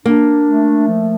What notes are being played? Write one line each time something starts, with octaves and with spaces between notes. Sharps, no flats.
A#3 D4
A3
F3